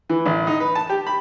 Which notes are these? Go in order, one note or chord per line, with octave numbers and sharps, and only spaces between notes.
E3
A1
D#4
B4
A5
G4
B5